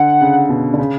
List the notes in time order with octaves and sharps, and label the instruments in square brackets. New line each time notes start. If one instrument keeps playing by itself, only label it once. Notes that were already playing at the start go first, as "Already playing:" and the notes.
Already playing: [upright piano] D3 [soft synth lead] F#5
[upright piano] C#3
B2
D3
C#3